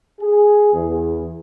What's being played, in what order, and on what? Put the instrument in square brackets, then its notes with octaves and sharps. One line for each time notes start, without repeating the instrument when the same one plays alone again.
[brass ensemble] G#4
E2